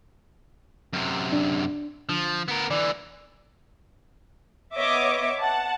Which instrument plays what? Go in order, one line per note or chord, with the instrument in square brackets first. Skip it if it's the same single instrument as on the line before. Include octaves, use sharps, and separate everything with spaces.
[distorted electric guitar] F#2 C3
[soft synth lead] D4
[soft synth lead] D3 [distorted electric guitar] F3
[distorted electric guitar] B3 A#4
[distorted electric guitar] D3 E3 [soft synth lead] D5
[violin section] B3 C#5 D#5 E5 D6
F#5 A5